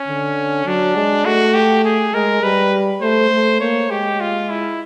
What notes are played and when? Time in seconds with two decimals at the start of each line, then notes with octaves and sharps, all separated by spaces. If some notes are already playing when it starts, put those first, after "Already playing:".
Already playing: C#4
0.08 D3
0.66 F#3 D4
0.96 G#3
1.25 A3 F#4
1.54 G4
1.85 G#4
2.13 G#3 A#4
2.43 G3 B4
3.01 A3 C5
3.31 A3
3.60 A#3 C#5
3.90 G#3 G4
4.20 F4
4.49 E4